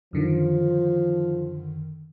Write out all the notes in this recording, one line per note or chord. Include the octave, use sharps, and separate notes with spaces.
F#2 D3 D#3 F3